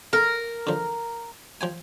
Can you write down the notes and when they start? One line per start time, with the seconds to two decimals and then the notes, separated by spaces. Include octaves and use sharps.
0.13 A4 A#4
0.67 D3 F3
1.61 F3 G5 G#5